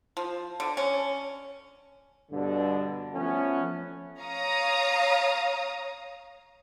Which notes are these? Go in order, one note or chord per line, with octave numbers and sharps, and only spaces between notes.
F3
D3
C#4
G2 B2 D3
F3 A3 B3 C#4
C#5 F5 A#5 D#6